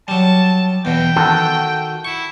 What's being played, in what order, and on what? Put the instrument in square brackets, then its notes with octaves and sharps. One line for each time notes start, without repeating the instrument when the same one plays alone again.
[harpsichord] F#3 G3 [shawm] A5
[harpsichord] E2 B2 [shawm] G5
[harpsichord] D#3 [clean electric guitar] F#4 A4
[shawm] E4 [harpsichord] C#6